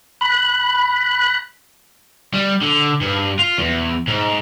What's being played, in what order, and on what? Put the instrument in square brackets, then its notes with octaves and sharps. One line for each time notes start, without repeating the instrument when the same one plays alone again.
[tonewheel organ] B5 F#6
[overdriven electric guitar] G3
D3
G2
F4
E2
G#2